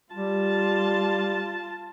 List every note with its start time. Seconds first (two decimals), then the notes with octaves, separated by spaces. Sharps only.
0.13 G3 F4 A5